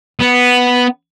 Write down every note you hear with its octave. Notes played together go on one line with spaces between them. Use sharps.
B3